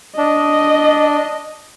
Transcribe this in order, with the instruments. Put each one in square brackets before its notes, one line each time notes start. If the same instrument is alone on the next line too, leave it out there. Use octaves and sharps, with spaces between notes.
[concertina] D4 [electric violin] D#5